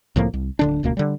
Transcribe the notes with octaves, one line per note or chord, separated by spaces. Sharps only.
C2 A2 F3 A#3
C2
D1 D3 D4
D#1 C#2 B2 A#3
D3 G3